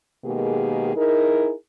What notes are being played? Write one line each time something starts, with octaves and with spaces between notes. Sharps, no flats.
B2 D#3 G#3 A#3 G4 G#4
D#4 E4 G#4 A#4